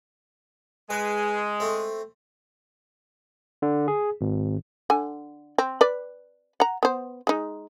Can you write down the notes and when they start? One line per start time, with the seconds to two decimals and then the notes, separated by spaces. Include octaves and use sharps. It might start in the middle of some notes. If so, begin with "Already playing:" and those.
0.90 G#3 B4
1.60 A3 C4
3.62 D3
3.88 G#4
4.21 G#1
4.90 D3 G#5
5.58 C4
5.81 B4 D5
6.60 F#5 A#5
6.83 B3 C5
7.27 G#3 D#4